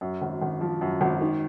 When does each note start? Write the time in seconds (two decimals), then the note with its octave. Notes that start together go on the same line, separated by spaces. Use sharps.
0.01 F#2
0.22 G#1
0.42 G#1
0.61 F3
0.81 F#2
1.01 G#1
1.21 D#3